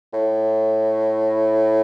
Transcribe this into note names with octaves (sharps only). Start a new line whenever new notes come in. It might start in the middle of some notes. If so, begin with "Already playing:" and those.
A2